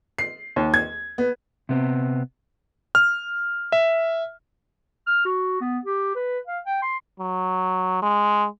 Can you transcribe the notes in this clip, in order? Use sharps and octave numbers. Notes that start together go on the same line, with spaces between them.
C7
D#2
G#6
B3
C3 B3 C4
F6
E5
F6
F#4
B3
G4
B4
F5
G5
C6
F#3
G#3